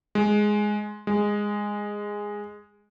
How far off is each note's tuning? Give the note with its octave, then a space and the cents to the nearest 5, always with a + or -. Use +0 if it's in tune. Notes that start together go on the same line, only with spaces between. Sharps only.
G#3 +5
G#3 -10